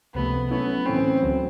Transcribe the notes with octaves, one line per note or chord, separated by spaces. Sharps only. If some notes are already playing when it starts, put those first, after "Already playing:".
C#2 C3 F3 A3 B3
F#3 A3 B3 C#4 E4
A2 E3 A3 C4 C#4
D2 D3 F#3